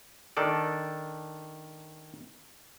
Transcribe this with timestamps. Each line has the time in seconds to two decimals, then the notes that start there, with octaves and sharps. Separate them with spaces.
0.37 D#3 D4 A4 D5